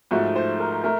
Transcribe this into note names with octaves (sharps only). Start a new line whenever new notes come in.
G#2 F3 A3 F#4
C5
A#4
A3 A#4